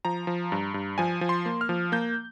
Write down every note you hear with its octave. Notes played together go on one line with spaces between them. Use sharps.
F3 A#5
F3
G2
G2
F3 G#5
F3
C6
A#3
F6
F3
A#3 G6